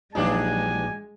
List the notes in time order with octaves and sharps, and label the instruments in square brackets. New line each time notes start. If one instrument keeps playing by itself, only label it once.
[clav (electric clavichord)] A#1 F#3 D#4 [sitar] E3 D4 G4 [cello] G#3 [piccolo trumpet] G#5